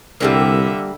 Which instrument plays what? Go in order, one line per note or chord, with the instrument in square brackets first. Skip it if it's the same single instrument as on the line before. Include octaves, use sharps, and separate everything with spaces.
[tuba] C2 [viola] D3 E5 [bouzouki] G3 G#3 A#3